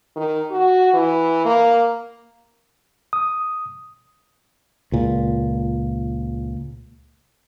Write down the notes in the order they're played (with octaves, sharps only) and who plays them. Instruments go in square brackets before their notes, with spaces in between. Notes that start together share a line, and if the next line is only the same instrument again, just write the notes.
[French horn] D#3
F#4
E3
A#3
[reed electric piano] D#6
[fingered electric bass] C#2 A#2